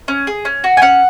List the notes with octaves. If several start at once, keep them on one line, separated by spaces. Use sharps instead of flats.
C#4
G#4
C#4
F#4
G#5
C#4 F#5